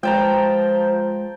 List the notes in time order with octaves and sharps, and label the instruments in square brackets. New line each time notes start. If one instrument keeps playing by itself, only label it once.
[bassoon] F3 [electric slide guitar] G#3 B4 [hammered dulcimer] G5 A5 A#5